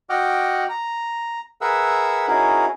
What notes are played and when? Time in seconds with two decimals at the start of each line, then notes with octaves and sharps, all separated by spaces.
0.10 F#4 D#5 F#5 G5 D6 F6
0.69 A#5
1.61 G#4 A#4 B4 E5 F#5 E6
2.28 C#4 D#4 E4 F#4 G#4 A#4